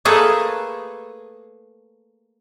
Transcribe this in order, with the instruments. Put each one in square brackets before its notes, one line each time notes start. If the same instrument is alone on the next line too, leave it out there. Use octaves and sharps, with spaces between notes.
[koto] A3 A#3 G#4 A4 B4